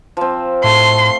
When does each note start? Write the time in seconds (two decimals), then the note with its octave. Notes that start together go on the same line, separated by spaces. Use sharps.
0.17 F3 C4
0.64 A2 A3 C6